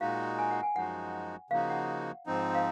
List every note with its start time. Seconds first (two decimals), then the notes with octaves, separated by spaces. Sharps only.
0.01 A#2 G#3 D#4 F#4 F5
0.38 G#5
0.51 F#5
0.63 G#5
0.76 F#2 F3 G#3 D#4 F#4 F#5
1.50 C#3 F3 A#3 D#4 F#4 F5
1.70 F#5
2.26 G#2 F3 C4 D#4
2.55 F5